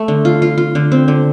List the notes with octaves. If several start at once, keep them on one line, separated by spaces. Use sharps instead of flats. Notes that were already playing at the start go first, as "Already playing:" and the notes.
Already playing: A3
D3
F4
F4
F4
D3
C4
D3